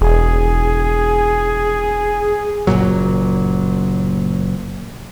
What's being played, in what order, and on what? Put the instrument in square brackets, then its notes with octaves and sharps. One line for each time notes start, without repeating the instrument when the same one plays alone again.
[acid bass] E1 [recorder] G#4
[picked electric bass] F#1 C2 A#2 F#3